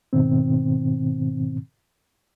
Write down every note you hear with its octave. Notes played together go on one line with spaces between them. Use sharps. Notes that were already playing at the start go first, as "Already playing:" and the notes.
G#2 B2 D#3 C4